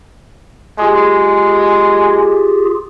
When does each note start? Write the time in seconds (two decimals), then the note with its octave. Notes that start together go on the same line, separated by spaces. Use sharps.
0.79 G#3 F4 G4 G#4